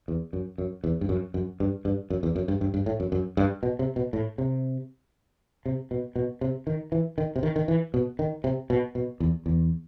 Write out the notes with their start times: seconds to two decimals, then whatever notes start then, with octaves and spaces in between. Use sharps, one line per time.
0.08 E2
0.33 F#2
0.58 F#2
0.84 E2
1.01 G2
1.09 F#2
1.34 F#2
1.60 G2
1.85 G2
2.10 F#2
2.23 E2
2.36 F#2
2.48 G2
2.61 G2
2.74 G2
2.86 A2
3.00 F#2
3.12 F#2
3.37 G2
3.63 B2
3.79 C3
3.96 B2
4.13 A2
4.38 C3
5.66 C3
5.91 B2
6.16 B2
6.41 C3
6.67 D#3
6.92 E3
7.18 D#3
7.36 C3
7.43 D#3
7.56 D#3
7.68 E3
7.94 B2
8.19 D#3
8.44 C3
8.70 B2
8.95 B2
9.20 E2
9.46 E2